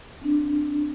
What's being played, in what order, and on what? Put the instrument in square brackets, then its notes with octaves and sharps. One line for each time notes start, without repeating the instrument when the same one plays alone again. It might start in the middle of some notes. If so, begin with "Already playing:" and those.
[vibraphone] C4 D4